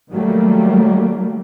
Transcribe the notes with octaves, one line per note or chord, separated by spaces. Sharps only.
D#3 F#3 G3 A3 A#3